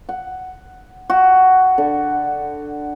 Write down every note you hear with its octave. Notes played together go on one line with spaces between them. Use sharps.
F#5
F#4
D3